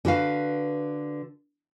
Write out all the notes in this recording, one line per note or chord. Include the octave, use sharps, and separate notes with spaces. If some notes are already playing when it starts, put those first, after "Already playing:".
D3 F#4 B4 F5